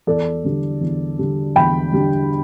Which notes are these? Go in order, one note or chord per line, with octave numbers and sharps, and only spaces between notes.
E2 A4 D5
D3 G3 D4
E2
D3 G3 D4
E2 G5 B5
D3 G3 D4